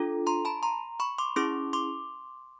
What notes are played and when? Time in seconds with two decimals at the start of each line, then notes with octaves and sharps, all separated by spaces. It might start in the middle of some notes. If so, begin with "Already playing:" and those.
Already playing: D4 F4 A4
0.27 A#5 C6
0.45 A5 B5
0.63 A#5 C6
1.00 B5 C#6
1.18 C6 D6
1.36 C#4 E4 G#4 C6 D6
1.73 C6 D6